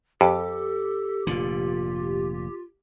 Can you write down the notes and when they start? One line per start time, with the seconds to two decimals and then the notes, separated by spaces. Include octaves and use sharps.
0.21 F2 G4 A4
1.27 F1 A#2 D3 F4